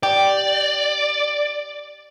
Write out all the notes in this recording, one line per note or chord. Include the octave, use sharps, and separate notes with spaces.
G4 D5